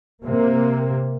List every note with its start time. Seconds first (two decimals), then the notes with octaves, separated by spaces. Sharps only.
0.24 C3 A#3